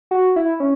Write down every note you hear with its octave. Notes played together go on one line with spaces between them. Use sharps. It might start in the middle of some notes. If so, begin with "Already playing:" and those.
F#4
E4
C#4